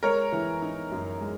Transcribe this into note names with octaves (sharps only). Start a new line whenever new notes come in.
G#3 A#4 C#5
E3
D#4
F#2
G#3